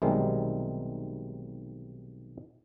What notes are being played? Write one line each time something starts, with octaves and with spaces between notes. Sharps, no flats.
B1 C3 D#3 G3 G#3